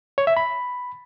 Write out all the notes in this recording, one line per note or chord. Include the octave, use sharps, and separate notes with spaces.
C#5
E5
B5